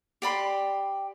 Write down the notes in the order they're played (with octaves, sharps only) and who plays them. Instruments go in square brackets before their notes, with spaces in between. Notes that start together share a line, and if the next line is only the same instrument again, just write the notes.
[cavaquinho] G4 D5 B5 C6